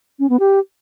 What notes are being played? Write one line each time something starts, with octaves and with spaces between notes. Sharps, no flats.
C#4
B3
G4